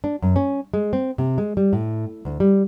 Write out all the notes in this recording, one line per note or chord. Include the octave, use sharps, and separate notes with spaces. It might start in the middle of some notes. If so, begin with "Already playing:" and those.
D4
F#2
C#4
G#3
C4
C3
G#3
G3
A2
D2
G3